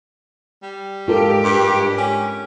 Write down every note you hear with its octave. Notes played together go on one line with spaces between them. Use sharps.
G3
G#2 F4 G4 A4 A#4
G2
C#4